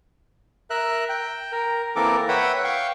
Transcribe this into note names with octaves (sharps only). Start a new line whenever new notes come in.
A#4 E5 F#6
G5
A#4
E3 A#3 C4 A4 A#4 D6
B4 C#5 E5 F#5 G5 B5
F5 G5 C#6